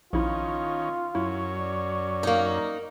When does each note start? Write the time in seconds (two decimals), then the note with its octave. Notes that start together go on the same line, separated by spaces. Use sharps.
0.13 A#1 D#3 C#4 E4 F4
1.15 F#2 C#4 E4
1.58 D5
2.23 A#3 D#4